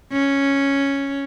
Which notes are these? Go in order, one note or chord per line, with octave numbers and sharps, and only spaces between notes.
C#4